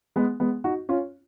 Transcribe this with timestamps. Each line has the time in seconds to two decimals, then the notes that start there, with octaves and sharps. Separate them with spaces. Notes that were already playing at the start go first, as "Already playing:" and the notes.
0.16 G#3 B3
0.40 G#3 B3
0.64 D#4 F#4
0.89 C#4 F4